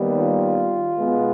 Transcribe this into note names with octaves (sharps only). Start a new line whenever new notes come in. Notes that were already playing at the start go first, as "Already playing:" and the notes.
Already playing: D#2 D#3 G3 B3
F4
B2 G#3 B3